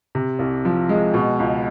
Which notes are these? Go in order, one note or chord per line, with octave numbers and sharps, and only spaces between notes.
C3
C2
F3
G#3
B2
C#2